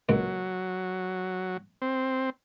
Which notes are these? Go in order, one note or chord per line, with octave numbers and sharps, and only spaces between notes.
C#2 A#2 F#3 G#3
C4